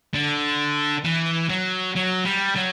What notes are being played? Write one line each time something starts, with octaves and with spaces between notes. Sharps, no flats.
D3
E3
F#3
F#3
G3
F#3